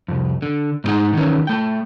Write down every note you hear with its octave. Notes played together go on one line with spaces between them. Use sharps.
C2 F2
D3
G#2 D3 G#3 D#4 F#5
D#3 E3 C#4
A3 G5